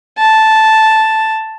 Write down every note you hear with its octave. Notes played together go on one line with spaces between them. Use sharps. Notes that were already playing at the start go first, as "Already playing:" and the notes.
A5